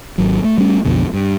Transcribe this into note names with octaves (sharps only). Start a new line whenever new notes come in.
G#1 F#3
A3
G3 A3 C#4
B1 F2 B2 D3
G2